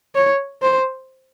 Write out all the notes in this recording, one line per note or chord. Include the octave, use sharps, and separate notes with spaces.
C#5
C5